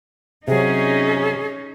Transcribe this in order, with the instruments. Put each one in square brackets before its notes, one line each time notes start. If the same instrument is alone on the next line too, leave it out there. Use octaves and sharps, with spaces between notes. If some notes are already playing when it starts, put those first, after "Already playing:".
[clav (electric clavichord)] C3 F#3 [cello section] C#4 D#4 [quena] G#4